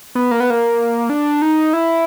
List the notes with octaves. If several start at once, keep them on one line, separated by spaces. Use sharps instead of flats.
B3
A#3
B3
A#3
D4
D#4
E4